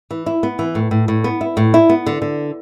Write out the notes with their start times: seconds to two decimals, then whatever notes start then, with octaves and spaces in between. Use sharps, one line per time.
0.11 E3
0.26 E4
0.43 B3
0.59 E3
0.75 A2
0.91 A2
1.08 A2
1.24 B3
1.41 E4
1.57 A2
1.74 E4
1.89 B3
2.06 D3
2.22 D3